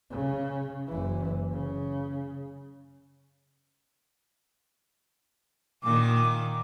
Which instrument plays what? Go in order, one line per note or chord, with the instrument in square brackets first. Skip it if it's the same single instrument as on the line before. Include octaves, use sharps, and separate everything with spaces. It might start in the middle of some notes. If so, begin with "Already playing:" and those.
[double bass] C#3
F#1 E3
C#3
[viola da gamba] A#2 D#3 [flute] D6